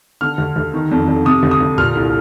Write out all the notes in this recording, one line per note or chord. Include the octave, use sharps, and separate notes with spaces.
D3 F6
D2
D2
D#3
F2
F2
C3 D#6
D2
D#6
D2
A#2 F6
C2